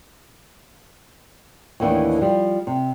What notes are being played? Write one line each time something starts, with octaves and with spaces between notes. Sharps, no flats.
D#2 A2 D#3 E3 B3 D4
F3 G3
C3